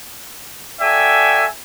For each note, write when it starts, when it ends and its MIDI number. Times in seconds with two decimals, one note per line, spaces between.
0.81 1.48 66
0.81 1.48 69
0.81 1.48 74
0.81 1.48 76
0.81 1.48 79
0.81 1.48 80